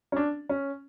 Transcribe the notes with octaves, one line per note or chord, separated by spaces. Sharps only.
C#4
D4
C#4